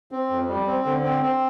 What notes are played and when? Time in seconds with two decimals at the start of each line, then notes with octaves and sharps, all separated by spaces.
0.12 C4
0.30 F2
0.49 G3
0.67 C4
0.85 D3
1.04 C4
1.22 C4